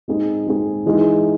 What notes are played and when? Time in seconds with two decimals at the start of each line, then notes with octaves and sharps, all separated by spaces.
0.08 G#3 C4 D#4 G#4
0.47 G#3 C4 D#4 G#4
0.86 E3 G#3 D#4 G#4